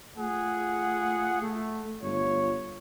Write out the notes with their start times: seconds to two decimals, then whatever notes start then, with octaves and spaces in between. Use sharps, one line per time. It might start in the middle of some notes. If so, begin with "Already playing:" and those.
0.16 A3 F4 G#4 F#5
1.41 A3
2.02 G1 F4 C#5